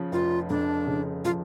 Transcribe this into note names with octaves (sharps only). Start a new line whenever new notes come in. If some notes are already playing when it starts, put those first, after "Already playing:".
Already playing: C#3 F3
F1 F4
F2 D4
C#3
F3 F4